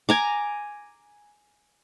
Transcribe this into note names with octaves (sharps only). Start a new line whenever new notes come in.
G#5 A#5 D6